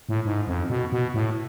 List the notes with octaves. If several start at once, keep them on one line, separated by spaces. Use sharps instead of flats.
A2
G#2
F2
B2
B2
A2